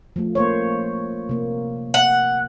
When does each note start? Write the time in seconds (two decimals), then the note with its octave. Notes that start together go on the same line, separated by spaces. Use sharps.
0.16 F3 A3
0.35 A#3 C5 C#5
1.29 C3 A#3
1.94 F#5